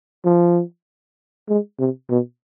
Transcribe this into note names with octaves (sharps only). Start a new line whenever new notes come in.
F3
G#3
C3
B2